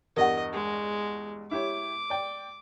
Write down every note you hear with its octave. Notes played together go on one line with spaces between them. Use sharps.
E2 G2 A#4 D#5 F#5
G#3
E4 G4 C#5 D6
D5 G5